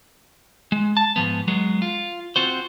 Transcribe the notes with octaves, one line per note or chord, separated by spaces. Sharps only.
G#3
A5
G#2 F3 B3
F#3 G#3 B3
F4
C4 F4 F#4 C5